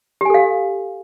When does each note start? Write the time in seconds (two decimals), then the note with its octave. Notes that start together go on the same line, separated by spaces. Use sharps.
0.21 G4
0.25 G#5
0.30 A4
0.34 F5